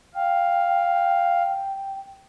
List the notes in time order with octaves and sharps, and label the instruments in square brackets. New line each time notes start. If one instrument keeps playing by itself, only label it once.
[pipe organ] F5 [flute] G5